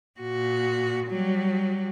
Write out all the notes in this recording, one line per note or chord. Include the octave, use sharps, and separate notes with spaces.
A#2 F#4
F#3 G3